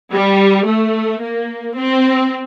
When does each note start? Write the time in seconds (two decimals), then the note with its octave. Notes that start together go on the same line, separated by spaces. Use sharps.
0.12 G3
0.66 A3
1.21 A#3
1.75 C4